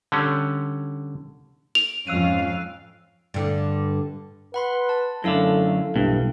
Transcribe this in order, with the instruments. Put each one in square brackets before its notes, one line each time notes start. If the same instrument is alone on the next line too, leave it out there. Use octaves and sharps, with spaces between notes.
[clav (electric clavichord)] D3 G3 C#4
[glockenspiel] D7 [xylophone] F7
[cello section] F2 G#2 F5 [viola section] C#4 F4 [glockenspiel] E6 F#6 D#7
[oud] G2 D3
[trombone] B4 [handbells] F#5 B5 C6
[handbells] A5
[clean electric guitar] F#2 D3 [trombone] A3 [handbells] E4 A4 F5
[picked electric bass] B1 G3 A#3 [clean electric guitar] G2 [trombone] E3